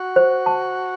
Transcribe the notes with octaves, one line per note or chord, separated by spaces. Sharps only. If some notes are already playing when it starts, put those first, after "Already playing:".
Already playing: F#4
C5
A5